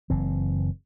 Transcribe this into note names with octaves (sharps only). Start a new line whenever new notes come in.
F#1 E3 C4